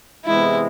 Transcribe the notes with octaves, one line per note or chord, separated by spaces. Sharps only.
C3 E3 G#3 B3 E4